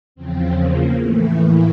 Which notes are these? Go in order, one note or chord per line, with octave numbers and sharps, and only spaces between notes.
E2 C#3 F3 C4
A#3
A2 E3 A3
A#3